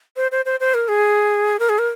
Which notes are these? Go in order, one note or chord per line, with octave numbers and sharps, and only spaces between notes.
C5
C5
C5
C5
A#4
G#4
A#4
G#4
A#4